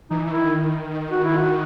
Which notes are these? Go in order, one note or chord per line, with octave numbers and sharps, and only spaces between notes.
E3 D#4
E3
D#3 E4
F#4
E4
F#4